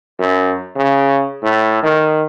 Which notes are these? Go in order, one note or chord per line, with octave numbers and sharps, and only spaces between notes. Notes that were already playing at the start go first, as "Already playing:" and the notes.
F#2
C#3
A2
D#3